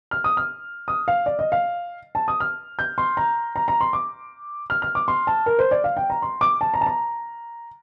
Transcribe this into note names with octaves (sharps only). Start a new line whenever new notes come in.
F6
D#6
F6
D#6
F5
D5
D#5
F5
A5
D#6
F6
G6
C6
A#5
A#5
A#5
C6
D6
F6
F6
D6
C6
A5
A#4
C5
D5
F5
G5
A#5
C6
D6
A5
A#5
A5
A#5